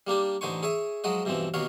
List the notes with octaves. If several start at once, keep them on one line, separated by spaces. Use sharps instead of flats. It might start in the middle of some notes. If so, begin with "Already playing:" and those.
G3 A#3 D4 G4
A1 D3 D#4 C5 G#5 C#6
G#4 C#5 E5 G#5
F3 F#3 G#3 F#4 D#5
G2 B2 E3 F3 C4
D#2 B2 D#3 C#5 F5